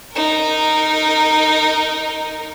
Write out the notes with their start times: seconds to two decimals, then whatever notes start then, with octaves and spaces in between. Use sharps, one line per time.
0.14 D#4 A#4